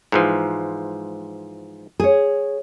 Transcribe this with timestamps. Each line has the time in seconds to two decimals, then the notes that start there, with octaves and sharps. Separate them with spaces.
0.12 G#2 E3 F3
2.00 G#4 C#5